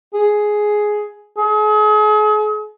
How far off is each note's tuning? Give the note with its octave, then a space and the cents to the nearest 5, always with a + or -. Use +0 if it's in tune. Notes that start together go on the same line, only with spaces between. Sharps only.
G#4 +10
G#4 +40